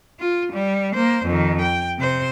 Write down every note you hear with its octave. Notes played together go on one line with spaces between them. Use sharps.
F4
G3
A#3 C5
F2 D#3
G5
C3 C5